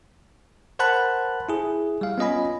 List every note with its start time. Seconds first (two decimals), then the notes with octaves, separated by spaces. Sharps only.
0.79 A#4 C5 F#5 A5 B5 F#6
1.49 E4 G#4
2.01 G3 F5
2.18 B3 C#4 F4 D#5 G#5 B5